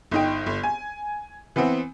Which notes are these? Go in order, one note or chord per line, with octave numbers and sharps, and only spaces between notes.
G1 D#4 G5
G1
G#5
E3 B3 C4